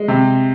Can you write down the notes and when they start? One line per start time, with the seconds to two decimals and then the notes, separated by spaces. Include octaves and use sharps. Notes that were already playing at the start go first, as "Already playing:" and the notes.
Already playing: G#3
0.08 C3